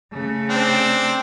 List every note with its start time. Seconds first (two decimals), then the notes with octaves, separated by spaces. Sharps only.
0.12 C#3 A3
0.49 C4 D4